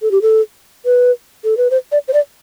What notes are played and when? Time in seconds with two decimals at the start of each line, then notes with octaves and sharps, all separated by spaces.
0.02 A4
0.11 G4
0.22 A4
0.85 B4
1.44 A4
1.57 B4
1.70 C5
1.92 D5
2.08 C5
2.13 D5